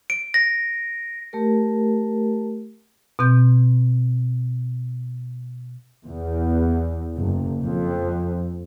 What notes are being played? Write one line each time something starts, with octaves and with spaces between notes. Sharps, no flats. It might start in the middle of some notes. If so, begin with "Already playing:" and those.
D7
A#6
A3 G4 A#4
B2 C4 G6
E2
F#1
F2